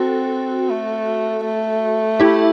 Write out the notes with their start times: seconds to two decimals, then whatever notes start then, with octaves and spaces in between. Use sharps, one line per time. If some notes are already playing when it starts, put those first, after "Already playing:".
Already playing: C4 F#4 A4
0.70 A3
1.45 A3
2.20 E4 G4